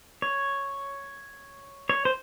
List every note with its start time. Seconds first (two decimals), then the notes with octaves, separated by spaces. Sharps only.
0.22 C#5
1.89 C#5
2.05 C5